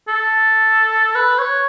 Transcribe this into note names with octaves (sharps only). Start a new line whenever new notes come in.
A4
B4
C#5